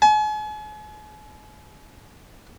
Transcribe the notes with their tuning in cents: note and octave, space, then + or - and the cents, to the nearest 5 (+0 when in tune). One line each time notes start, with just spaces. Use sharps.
G#5 +40